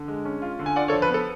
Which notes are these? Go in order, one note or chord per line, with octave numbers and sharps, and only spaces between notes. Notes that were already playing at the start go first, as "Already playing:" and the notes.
Already playing: D3
G#3
C#4
F4
D3
G#5
F4 D5 F#5
A4 C#5
F3
B4
B3 A4